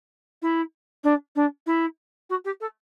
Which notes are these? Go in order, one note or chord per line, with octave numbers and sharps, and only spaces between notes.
E4
D4
D4
E4
F#4
G4
A4